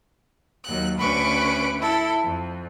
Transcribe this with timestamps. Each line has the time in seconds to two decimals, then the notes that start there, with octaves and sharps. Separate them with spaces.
0.64 D#2 F#3 F#6
0.97 D2 C#4 B4 B5 C#6 D6
1.76 E4 A4
2.22 F2